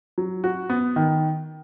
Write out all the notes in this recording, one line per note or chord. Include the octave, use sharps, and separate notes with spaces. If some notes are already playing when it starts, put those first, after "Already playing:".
F#3
F#4
B3
D#3